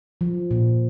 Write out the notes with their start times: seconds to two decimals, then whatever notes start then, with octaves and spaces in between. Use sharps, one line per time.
0.21 F3
0.51 A#2